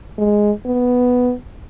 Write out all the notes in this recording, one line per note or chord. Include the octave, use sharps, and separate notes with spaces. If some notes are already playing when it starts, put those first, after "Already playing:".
G#3
B3